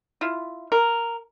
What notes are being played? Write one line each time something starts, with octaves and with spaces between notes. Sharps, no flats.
E4 F4
A#4